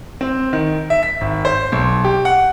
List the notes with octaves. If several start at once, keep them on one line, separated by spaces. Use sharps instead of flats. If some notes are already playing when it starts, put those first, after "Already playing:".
C4
D#3
E5
B6
G#1
C5
B1
G4
F#5